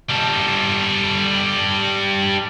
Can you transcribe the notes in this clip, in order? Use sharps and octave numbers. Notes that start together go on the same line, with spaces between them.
G3 A4